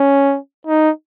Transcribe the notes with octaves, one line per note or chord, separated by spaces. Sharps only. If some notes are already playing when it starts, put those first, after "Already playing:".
Already playing: C#4
D#4